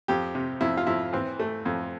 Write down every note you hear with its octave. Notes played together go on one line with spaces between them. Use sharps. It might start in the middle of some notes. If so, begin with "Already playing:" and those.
F2 G4
C3
F2 E4
F4
F2 E4
E3 C4
A3
F2